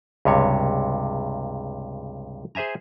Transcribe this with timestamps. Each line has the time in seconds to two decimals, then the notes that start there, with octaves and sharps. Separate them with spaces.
0.25 C#2 G2 C3 C#5
2.55 G#4 C5 E5 G#5 A#5